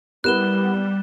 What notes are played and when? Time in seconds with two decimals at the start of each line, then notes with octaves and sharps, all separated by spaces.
0.24 G3 B3 E4 G4 A#4 F#6 E7 G7